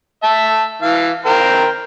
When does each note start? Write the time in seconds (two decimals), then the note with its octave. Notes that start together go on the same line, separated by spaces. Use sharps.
0.23 E5 A5
0.82 E3 F5
1.26 A#4 C5 G5